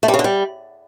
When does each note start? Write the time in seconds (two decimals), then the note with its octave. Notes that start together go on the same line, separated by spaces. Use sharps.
0.03 A3
0.08 G3
0.14 C#3
0.19 D3
0.24 G3